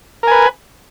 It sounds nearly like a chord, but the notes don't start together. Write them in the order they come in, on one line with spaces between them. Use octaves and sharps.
A#4 G#5 B4